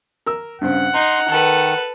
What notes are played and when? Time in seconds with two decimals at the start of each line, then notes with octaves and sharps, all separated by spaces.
0.26 A#4 E6
0.61 G2 C#3 C4 F#5
0.94 D#4 A#5 C6
1.28 D#3 A4 B4